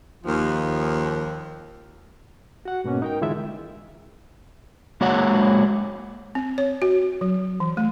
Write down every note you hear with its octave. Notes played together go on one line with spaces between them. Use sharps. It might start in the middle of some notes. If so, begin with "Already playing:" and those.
D#2 F3
F#4 F#5
G#2 B2 A#3 C#4
D#4 A#4 G5
D3 E3 G#3 E4 F4 E5
G#3 A#3 F#4 C#5 F#5
C4
C#5
F#4
F#3
E3
A3